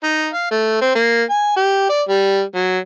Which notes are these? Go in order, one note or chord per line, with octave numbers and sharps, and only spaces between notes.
D#4
F5
A3
C4
A#3
G#5
G4
D5
G3
F#3